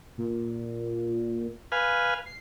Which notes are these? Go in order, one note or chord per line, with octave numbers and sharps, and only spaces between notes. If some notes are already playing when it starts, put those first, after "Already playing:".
A#2
B4 F5 G#5
C7